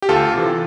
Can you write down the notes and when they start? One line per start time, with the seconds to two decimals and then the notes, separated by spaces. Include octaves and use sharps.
0.02 G4
0.09 D2 F4 A4
0.34 C3 E3